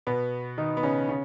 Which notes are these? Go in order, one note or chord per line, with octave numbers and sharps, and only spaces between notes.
B2 B3
D#3 D#4
B3
C#3 C#4
C#3 C#4